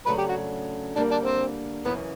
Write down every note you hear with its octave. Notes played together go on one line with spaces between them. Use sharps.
C#3 F#3 A3 D4 B4
G4
F#4
D3 G3 A#3 D4
D4
C4
F#2 C#3 E3 B3